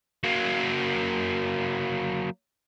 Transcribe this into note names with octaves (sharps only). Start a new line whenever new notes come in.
F#3 A#3